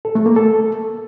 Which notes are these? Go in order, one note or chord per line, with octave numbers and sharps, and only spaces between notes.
A4
A3
A#3
A4